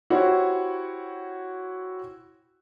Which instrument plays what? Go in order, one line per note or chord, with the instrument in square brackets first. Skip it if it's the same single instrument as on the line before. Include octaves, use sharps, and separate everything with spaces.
[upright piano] E4 F#4 G4 C5 C#5